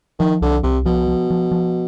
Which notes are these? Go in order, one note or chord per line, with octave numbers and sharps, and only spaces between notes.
D#3 F3
C2 D3
C2 C3
B2 F3
F3
F3
F3